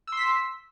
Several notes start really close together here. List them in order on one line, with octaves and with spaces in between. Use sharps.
E6 C6 B6